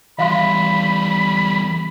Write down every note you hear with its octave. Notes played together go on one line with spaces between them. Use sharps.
E2 G3 E5 F5 B5 C6